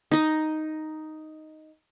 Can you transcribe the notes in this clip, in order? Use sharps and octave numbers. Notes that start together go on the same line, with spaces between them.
D#4 D#5